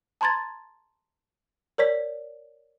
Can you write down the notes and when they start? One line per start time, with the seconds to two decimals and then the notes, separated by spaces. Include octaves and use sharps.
0.21 A5 A#5 C6 G#6 A6
1.78 A#4 C#5 D5 B6